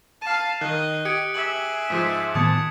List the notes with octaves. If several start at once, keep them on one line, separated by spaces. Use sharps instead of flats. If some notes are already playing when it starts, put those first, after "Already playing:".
F5 A5 D#7
D#3 D#5 F#6
G4 D#6 G#6 C#7 D7
G#4 E5 F#7
G#2 F3 G#3 B6
A2 D#3 B3 A5 D#6 G#6 C#7